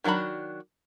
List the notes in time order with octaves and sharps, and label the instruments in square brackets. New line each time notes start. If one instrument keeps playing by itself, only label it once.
[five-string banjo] D#3 F#3 D4 F#4 B5